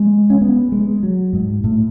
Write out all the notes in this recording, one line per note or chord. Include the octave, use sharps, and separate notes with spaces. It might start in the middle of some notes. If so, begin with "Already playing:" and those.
Already playing: G#3
C#4
B3
G#3
F#3
G#2
A2